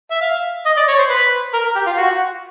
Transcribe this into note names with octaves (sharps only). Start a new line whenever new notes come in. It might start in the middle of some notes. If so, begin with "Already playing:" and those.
E5
F5
D#5
D5
C#5
C5
B4
A#4
G4
F4
F#4